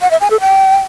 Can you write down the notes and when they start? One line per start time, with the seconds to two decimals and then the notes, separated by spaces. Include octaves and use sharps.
0.01 F#5
0.11 E5
0.21 G#5
0.30 A4
0.40 G5